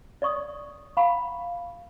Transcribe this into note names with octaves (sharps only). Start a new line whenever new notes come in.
D5 D#5 C#6 D#6
F5 F#5 A#5 B5 C#6